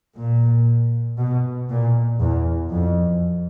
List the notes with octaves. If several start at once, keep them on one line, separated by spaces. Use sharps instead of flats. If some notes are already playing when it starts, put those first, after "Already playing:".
A#2
B2
A#2
E2
F2